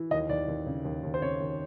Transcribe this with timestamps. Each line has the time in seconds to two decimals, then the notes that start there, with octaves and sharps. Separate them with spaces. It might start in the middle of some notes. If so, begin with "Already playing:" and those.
Already playing: E3
0.11 D#2 D#5
0.29 D#2 D5
0.48 D#2
0.66 C#3
0.85 D#2
1.03 D#2
1.14 C5
1.22 C#3 C#5
1.40 D#2